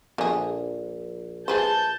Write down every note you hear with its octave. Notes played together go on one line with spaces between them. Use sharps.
A#1 D3 G#4
G#4 B4 C5 A5 G6